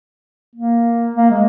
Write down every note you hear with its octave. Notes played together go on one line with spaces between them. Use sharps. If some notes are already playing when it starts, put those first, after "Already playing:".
A#3
A#3
G#3